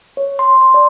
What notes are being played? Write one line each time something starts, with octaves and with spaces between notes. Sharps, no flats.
C#5
C6
C6
D5